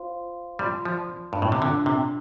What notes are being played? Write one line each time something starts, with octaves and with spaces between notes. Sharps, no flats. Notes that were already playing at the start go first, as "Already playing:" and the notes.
Already playing: F4 C5 F5 C6
G3 F4 D5 A5 C6
F3
G2
A2
C3
D3 D4 F4 D5
C3